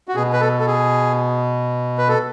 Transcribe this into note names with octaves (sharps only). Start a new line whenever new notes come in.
F#4
B2 G#4
B4
A4
A4
G#4
B4
A4